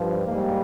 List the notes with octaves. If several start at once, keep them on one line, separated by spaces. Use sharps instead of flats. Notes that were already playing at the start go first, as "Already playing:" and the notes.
Already playing: G2 F3
G#2 G3 A#3